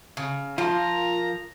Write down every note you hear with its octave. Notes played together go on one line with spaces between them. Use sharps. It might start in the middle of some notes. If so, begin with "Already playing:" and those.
C#3
F3 F4 A#4 A#5